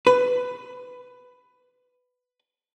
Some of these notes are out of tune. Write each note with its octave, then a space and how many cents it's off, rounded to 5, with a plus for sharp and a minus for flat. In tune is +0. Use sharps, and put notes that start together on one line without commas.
B4 +10